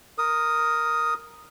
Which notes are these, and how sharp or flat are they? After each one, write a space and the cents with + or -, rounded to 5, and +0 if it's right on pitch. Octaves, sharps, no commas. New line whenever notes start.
A#4 +0 D#6 +0